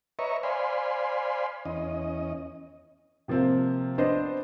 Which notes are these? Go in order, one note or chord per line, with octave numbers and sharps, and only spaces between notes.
B4 C#5 D#5 E5 A#5 C#6
C5 D5 F5 G#5 B5 C6
E2 C#4 D#5
C3 F3 A#3 C4 F4
B3 D4 C5 D#5